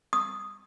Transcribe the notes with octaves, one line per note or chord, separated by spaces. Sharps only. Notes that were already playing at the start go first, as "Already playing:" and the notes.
D#6